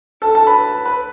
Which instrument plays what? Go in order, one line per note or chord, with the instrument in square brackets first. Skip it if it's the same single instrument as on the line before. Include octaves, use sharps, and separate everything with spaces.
[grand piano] A4 A5
A4 A5
B4 B5
B4 B5